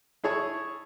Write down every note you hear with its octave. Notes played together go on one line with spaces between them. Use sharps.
E4 G#4 C#5 A5 C#6